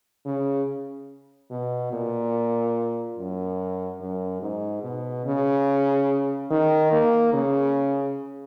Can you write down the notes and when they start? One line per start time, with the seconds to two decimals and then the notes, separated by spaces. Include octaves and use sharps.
0.25 C#3
1.51 B2
1.92 A#2
3.17 F#2
4.00 F#2
4.42 G#2
4.83 B2
5.25 C#3
6.51 D#3
6.92 A#3
7.33 C#3